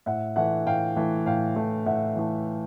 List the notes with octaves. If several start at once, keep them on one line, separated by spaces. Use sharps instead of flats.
A2 E5 F#5
E3 A3 E5 F#5
A2 F5 G5
E3 A3
A2 F5 G5
E3 A3
A2 E5 F#5
E3 A3